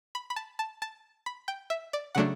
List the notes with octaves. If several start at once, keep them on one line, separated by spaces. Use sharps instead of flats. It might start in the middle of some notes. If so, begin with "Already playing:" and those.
B5
B5
A5
A5
A5
B5
G5
E5
D5
C#3 F#3 A3 D4 F#5